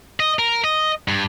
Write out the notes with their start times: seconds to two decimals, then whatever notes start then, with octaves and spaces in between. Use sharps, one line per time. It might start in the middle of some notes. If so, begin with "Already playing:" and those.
0.20 D#5
0.39 A#4
0.64 D#5
1.08 G2